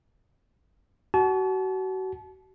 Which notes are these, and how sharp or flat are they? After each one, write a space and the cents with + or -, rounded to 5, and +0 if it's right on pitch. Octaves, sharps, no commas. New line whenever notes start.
F#4 +30 A5 -35